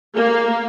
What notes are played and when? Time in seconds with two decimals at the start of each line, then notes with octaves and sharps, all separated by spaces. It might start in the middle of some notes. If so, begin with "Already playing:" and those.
0.15 A#3